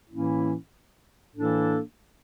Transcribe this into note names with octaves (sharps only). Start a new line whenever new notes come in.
A2 E3 A#3 C#4 E4
A2 E3 A#3 D4 A4